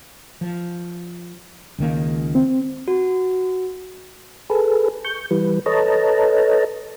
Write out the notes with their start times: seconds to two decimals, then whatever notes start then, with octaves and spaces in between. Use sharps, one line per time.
0.41 F3
1.78 C#2 D#3 A#3
2.35 C4
2.88 F#4
4.50 G#4 A4 B4
5.05 C#6 G6
5.31 E3 G3 B4
5.66 A4 B4 C#5 D#5 A5 A#5